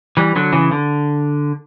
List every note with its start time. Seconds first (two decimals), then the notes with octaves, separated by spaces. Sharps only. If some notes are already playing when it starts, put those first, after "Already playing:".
0.17 E3 G3
0.36 D3 F#3
0.53 C#3 E3
0.71 D3